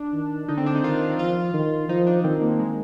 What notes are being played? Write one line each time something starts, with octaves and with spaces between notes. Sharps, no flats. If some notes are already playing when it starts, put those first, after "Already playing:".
Already playing: D4
D#3
D3 D#4
C4
D4
D#4
D#3 F4
F3 F4
D#3
F3 D#4
D4
D4
D#3 C4
A#3
G#3